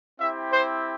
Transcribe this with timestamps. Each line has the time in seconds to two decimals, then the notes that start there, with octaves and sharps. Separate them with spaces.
0.18 C4 E4 G4 E5
0.51 C5